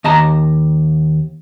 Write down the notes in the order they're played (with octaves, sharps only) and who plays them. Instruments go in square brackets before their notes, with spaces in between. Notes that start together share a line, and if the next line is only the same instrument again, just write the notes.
[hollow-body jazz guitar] D#2 D#5 A5 A#5